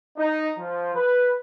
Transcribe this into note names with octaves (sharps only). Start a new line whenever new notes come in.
D#4
F3
B4